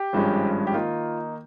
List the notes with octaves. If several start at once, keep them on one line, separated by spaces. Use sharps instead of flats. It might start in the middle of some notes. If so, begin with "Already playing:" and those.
Already playing: G4
G#1 G2 F3 G#3 C#4
G4
D#3 A#3 D#4 F4